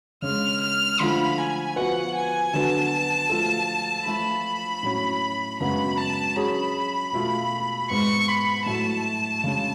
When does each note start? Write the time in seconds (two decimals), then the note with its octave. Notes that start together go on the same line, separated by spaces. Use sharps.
0.22 C#3 G#3 C#4 F6
0.61 F6
1.00 D3 F3 A3 F4 B5
1.38 G#5
1.76 F3 B3 F#4 B4 F#5
2.14 G#5
2.53 D3 F#3 B3 F#4 B4 A5
3.29 F3 A3 F4 A4
4.06 F3 A3 F4 B5
4.83 A2 F#3 C#4
5.60 F#2 C#3 G#3 B3 F#4 B5
5.98 A5
6.36 F#3 C#4 G#4 B5
7.13 B2 A3 F4
7.90 G#2 G#3 B3 C#6
8.28 B5
8.66 A2 F#3 A3 A5
9.44 C#3 G#3 C#4